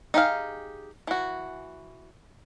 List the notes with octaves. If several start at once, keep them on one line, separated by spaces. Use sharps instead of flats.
D#4 G4 G#4 F5
E3 F#4